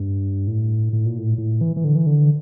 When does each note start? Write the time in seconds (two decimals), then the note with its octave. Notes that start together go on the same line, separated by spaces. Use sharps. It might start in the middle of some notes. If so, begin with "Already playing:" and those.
Already playing: G2
0.47 A2
0.93 A2
1.05 A#2
1.18 A2
1.38 A2
1.61 E3
1.76 E3
1.84 D3
1.95 E3
2.06 D3